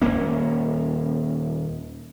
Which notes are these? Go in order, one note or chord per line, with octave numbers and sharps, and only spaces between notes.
D#1 F#2 A#3 C#4